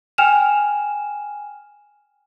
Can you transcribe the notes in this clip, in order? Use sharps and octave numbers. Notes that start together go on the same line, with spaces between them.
G5 G#5 F6 E7 F7